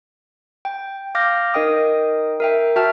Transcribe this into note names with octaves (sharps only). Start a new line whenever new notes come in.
G5
F5 D6 F6 G6 A#6
D#4 A#4 D#5 G5 D#6
A#4 E5 G5
F#4 E5 G5 A5 F6